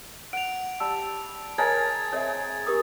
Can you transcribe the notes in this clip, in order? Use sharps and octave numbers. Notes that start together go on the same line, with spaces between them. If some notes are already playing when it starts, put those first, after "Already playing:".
F#5 D7 F7
G3 A5 E6
G#4 A#4 C#5 D#5 G#5 A5 G#6 A6
C4 G#4 C#5 D#5 E5
G4 A#4 D#6